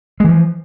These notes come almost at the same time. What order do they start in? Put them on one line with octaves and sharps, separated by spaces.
G#3 E3 F3